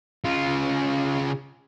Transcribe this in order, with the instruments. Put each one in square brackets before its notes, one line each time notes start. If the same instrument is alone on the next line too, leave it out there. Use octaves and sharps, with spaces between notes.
[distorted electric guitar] C#3 F4